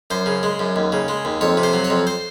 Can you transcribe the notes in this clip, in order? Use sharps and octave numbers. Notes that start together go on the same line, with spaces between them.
F#2 C5
C#3
G#3
F#2
D#2
C#3
G#3
D#2
F2 C#5
C3
C5
F#3
C#5
F2
C5